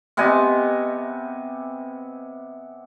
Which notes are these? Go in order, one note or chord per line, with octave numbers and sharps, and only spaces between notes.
C3 B3 D#5 G#5